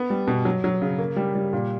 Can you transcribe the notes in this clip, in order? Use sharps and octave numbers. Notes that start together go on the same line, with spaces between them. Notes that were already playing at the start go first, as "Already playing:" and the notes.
Already playing: B3
G3
B2
F#3
F#3
C#3
A#3
G3
G3
A#2